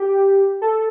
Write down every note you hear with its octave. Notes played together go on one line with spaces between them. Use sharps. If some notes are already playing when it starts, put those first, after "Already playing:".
Already playing: G4
A4